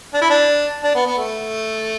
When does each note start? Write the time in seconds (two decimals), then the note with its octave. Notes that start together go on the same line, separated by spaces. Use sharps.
0.14 D4
0.21 E4
0.30 D4
0.83 D4
0.94 B3
1.06 B3
1.18 A3